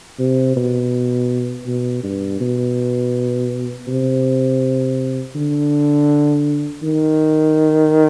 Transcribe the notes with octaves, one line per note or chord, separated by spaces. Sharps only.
C3
B2
B2
G2
B2
C3
D3
D#3